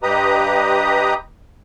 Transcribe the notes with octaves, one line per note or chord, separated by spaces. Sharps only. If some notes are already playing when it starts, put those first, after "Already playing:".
G2 G4 B4 D#5 A#5 D#6